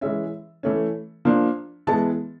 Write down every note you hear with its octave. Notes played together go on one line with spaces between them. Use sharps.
E3 G#3 C#4 E5
E3 A3 C#4
F3 A#3 D4
E3 G#3 B3 A5